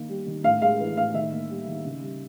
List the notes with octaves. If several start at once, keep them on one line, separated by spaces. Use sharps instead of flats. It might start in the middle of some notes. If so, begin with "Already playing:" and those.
Already playing: D#3 A#3
G3
D#3
A2 F5
G#3 F5
E3
A2 F5
D#3 E5
A#3
G3
D#3
C#3
G3